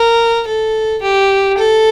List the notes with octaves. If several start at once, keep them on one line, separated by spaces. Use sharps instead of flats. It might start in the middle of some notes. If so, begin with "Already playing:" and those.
Already playing: A#4
A4
G4
A4